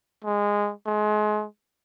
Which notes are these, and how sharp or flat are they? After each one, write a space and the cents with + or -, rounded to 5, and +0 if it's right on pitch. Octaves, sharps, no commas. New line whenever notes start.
G#3 -15
G#3 +30